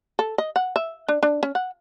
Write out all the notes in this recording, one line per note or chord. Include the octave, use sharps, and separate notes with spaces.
A4
D#5
F#5
E5
D4
D4
C#4
F#5